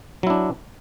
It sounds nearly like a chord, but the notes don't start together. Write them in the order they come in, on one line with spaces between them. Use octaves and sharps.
F#3 E4 D4